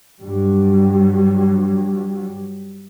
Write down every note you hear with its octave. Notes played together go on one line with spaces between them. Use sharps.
G2 F#3 G3